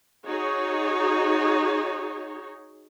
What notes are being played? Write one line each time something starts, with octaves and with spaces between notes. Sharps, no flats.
D#4 F#4 G#4 C#5